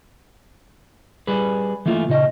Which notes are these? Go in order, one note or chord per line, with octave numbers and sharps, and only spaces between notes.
G3 G#4 B4
E3 A3 A#3 F4
A#2 C#3 D#4 D#5